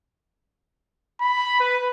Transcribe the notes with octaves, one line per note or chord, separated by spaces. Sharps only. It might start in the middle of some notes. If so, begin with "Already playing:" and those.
B5
B4